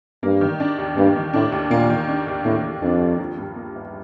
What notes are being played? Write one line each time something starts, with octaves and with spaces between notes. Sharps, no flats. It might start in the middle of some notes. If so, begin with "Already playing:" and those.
G2 A#3
D#3
D4
D#2
G2 A#3
D#3
A2 D4
D#2
A#2 A#3
D#3
D4
D#2
A2 A#3
D#3
F2 D4
D#2
F3
G2
A#3
G1